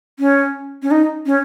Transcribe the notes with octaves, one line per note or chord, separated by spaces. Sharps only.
C#4
C#4
D#4
C#4